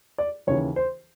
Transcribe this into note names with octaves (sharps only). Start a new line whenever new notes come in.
D5
D#2 C#3 E3 C#5
C5